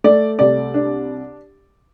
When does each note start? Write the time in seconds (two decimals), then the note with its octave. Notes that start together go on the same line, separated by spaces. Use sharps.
0.04 A3 D5
0.39 C2 D5
0.74 D4